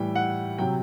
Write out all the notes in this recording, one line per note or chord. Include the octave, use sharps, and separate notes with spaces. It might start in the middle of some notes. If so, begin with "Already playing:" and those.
Already playing: A2 E3 G3 G5
F#5
C3 F#3 G5